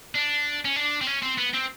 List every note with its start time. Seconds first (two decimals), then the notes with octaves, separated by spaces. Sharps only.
0.15 D4
0.65 C#4
0.76 D4
1.01 C4
1.07 C#4
1.23 C4
1.38 B3
1.54 C4